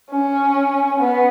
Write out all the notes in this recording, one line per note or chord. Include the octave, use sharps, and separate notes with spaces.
C#4
B3